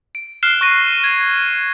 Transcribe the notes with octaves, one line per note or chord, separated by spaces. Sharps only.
D7
F6 F#6 C7 E7 G7
C#6 F#6 A#6 D#7
G#6